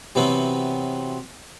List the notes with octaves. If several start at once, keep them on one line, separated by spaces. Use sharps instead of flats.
C3 E3 F#3 B3 C4 F#4